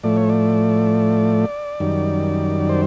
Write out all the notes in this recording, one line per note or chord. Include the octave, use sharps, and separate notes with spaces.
A2 F3 A3 D5
C#5
D5
F#2 D#3 G3
C5